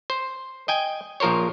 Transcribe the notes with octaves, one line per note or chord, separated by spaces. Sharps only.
C5
D#5 G5 G#5
A#1 F3 A#4 C5 C#5